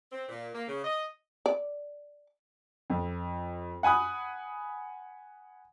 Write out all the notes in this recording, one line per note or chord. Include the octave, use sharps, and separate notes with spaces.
C4
A#2
A#3
C#3
D#5
D5
F2
F#5 G#5 B5 D#6 F#6